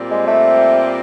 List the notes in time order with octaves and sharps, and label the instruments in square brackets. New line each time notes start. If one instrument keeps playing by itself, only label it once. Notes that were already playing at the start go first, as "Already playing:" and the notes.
Already playing: [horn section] A#2 G3 C4
[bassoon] G#3
A3